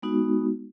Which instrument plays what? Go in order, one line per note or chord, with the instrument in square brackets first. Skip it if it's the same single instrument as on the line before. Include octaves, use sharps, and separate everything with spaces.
[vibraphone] G#3 B3 D#4 F#4